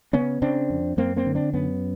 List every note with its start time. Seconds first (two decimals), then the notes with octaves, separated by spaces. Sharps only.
0.13 C#3 B3 C#4
0.42 C#3 C4 D4
0.70 F2
0.97 F#2 A#3 C4
1.16 A#3 C4
1.26 D3
1.35 C4 D4
1.53 F#2 B3 C#4